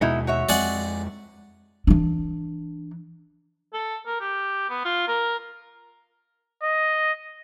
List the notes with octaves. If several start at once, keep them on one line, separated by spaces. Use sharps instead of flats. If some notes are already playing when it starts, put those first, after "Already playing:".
D#2 B2 G#3 B3 D#4 E4
F#4 C#5 E5
F2 G#3 C4 D5 F#5 G#5
E3 D4
A4
A#4
G4
B3
F4
A#4
D#5